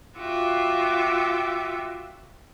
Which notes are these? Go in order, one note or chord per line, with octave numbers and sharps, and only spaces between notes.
F4 F#4 E5 G5 D6